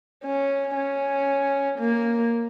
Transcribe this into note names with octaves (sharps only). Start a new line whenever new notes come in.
C#4
C#4
A#3